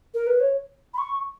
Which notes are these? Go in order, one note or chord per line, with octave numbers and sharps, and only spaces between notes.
A#4
B4
C#5
B5
C#6